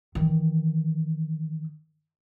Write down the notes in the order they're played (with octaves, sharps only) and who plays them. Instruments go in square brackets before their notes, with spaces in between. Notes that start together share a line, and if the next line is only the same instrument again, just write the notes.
[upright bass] D#3 E3